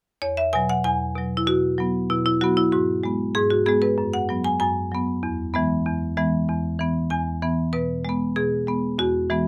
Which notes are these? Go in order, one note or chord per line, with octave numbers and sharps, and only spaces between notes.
E2 C#5
E5
B2 F#3 G#5
F#5
E2 G#5
B2 F#3
E4
B2 F#4
F#3 B3
B2 E4
E4
F#3 B3 F#4
E4
G#2 F#4
G#3 B3
G#2 G#4
F#4
G#3 B3 G#4
B4
F#2
F#5
F#3 B3
G#5
F#2 G#5
F#3 B3
E2
E3 G#3 B3
E2
E3 G#3 B3
E2
E3 B3
E2 G#5
E3 B3
B2 B4
G#3 B3
B2 G#4
G#3 B3
E2 F#4
E3 G#3 B3